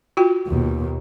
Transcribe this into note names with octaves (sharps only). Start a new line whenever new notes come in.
F4 F#4 G5
D#2 B2